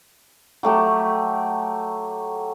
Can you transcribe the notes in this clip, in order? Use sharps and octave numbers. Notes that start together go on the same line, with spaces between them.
F#3 A3 G4